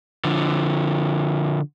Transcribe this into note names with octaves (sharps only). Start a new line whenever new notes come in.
D3 F3